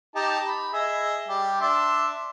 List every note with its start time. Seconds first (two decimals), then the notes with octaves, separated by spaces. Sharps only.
0.15 D#4 G4 A5
0.47 B5
0.73 G#4 D#5 E5
1.28 G3 G4
1.61 D4 E5 C6